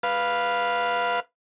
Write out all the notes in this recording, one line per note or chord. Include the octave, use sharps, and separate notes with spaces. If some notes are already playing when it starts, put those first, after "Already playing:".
B4 F5